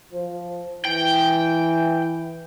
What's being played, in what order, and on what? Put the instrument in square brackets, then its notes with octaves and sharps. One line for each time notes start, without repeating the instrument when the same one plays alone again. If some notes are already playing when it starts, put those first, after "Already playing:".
[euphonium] F3
[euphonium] E3 [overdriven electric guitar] G5